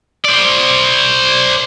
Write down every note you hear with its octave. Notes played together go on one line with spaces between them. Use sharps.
C5 D5